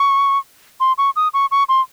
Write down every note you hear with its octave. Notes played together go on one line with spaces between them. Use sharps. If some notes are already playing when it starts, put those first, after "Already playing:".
Already playing: C#6
C6
C#6
D#6
C#6
C#6
C6